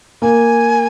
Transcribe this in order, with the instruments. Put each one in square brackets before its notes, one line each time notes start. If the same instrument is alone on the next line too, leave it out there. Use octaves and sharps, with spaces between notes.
[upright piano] A#3 [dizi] G#5